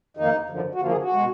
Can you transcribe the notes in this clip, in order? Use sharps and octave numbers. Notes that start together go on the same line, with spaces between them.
F2 D#3 A#3 D#4
F#2 D3 F3
F#4
F#2 D3 F3 A#3 F4
G#4
F#4
B2 G#3